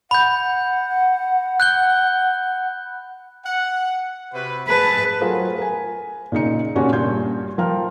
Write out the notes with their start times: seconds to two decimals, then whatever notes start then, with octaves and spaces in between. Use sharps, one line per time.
0.11 F#5 B5 G6
1.60 F#6 G6 G7
3.45 F#5
4.33 C3 F#4 B4
4.68 G#4 B4 E5 A5
5.20 F#3 A3 F4 G#4 A#4 C5
5.58 A#4 G#5
6.32 A#2 C#3 D#4 C#7
6.75 A#2 C#3 C#4 D4 F#4 G4
6.93 G2 A#2 C6 G6 G#6
7.58 F3 A#4 F5 G5 A#5 F6